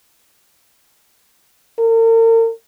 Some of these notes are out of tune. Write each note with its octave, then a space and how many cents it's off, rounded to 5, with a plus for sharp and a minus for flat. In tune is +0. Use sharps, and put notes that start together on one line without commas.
A#4 -40